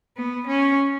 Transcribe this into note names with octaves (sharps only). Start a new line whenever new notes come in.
B3
C#4